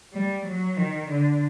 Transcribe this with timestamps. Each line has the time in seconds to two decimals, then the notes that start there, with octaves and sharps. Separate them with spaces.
0.13 G3
0.45 F#3
0.77 D#3
1.10 D3